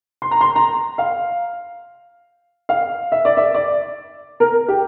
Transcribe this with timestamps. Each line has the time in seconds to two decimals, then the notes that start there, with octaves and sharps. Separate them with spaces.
0.22 C6
0.31 A#5
0.41 C6
0.56 A#5
0.98 F5
2.69 F5
3.12 E5
3.25 D5
3.37 E5
3.54 D5
4.40 A#4
4.68 G4